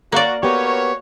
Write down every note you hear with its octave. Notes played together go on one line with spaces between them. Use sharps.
A#3 F#4 D5
B3 F#4 G4 A#4 C#5